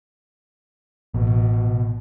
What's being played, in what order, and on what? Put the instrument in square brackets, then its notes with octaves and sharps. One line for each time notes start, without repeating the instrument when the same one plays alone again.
[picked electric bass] A1 [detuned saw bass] B2